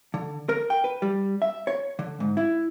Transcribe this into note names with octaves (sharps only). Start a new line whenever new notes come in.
D3
A#4
G5
B4
G3
E5
C#5
D3
G#2
E4